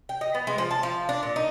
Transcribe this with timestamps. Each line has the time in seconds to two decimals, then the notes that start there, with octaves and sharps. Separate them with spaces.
0.09 G5
0.21 D#5
0.35 B3
0.47 G#3
0.58 F3
0.71 A5
0.83 F3
1.09 D4
1.23 A#2
1.36 D#4